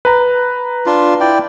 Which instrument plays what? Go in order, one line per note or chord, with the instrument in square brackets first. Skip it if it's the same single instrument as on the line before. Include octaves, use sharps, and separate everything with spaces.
[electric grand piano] B4 A#5
[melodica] D4 F4
E4 D5 G5